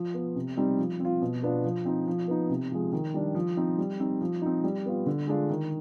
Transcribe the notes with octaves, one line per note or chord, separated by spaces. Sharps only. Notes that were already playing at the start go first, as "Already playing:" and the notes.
Already playing: F3
B3 F4
C3
G3 C4 D#4
F3
C4 F4
B2
B3 D4 F4
F3
C4 D#4
F3
B3 D#4
C3
F3 G#3
D#3
G3 D4
F3
C4 D#4
G3
C4 D#4
F3
C4 D#4
G3
B3 F4
D3
G#3 D4 F4
D#3